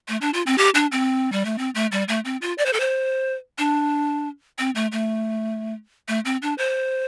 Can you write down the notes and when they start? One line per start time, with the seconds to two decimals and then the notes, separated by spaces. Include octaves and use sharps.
0.08 A3
0.21 D4
0.34 F4
0.47 C4
0.58 G4
0.75 D4
0.92 C4
1.32 G3
1.45 A3
1.58 C4
1.75 A3
1.92 G3
2.08 A3
2.25 C4
2.42 F4
2.58 D5
2.66 C5
2.73 A4
2.80 C5
3.58 D4
4.59 C4
4.75 A3
4.92 A3
6.08 A3
6.25 C4
6.42 D4
6.58 C5